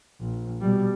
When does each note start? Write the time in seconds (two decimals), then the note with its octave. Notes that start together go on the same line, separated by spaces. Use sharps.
0.21 A#1
0.61 B2 G3